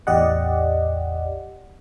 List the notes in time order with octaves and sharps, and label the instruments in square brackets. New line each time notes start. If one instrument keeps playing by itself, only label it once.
[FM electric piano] A1 E2 G4 D5 D#5 F#5